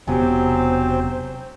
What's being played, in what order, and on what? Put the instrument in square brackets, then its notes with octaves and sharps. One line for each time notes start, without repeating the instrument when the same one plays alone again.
[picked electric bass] E1 C3 B3 [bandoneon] F#3 C4 [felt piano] G4 G#5 [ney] C5